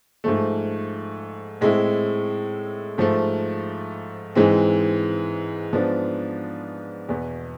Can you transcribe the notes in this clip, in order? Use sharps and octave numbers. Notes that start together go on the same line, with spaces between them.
G#2 F3 A3
A2 G#3 C4 E4
G#2 F3 A3
G#2 E3 G#3 C4
G#2 F3 B3 D4
E2 B2 B3